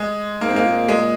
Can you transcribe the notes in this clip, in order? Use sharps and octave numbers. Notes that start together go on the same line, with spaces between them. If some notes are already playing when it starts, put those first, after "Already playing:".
Already playing: G#3
G#2 A#3
C4
G#2 A#3
A#2
G#3